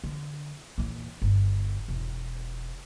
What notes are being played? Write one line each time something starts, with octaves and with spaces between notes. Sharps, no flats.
D3
E2 A#2
G1
E1